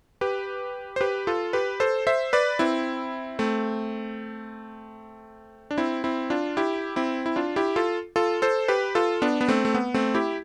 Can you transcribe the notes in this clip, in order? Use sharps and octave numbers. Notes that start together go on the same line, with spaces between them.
G4 B4
C5
G4 B4
F4 A4
G4 B4
A4 C5
C5 E5
B4 D5
C4 E4
A3 C4
D4
C4 E4
C4 E4
D4 F4
E4 G4
C4 E4
E4
D4 F4
E4 G4
F4 A4
F4 A4
A4 C5
G4 B4
F4 A4
B3 D4
B3
A3 C4
A3
B3
A3 C4
E4 G4